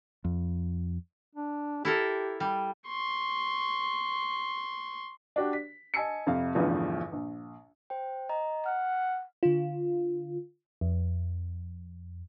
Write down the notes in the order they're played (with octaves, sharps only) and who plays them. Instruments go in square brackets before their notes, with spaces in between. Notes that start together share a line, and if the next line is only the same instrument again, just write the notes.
[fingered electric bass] F2
[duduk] D4
[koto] E4 A4 A#4 [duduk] G4
[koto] G3
[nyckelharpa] C6 C#6
[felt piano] D4 F#4 G4
B6
D#5 G#5 A5 E6 C#7
F2 C3 F5
A1 E2 G2 B2 D3 F3
A#1
[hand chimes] C5 G5
D#5 A#5
[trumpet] F#5 [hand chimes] F6
[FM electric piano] D3 F4
F2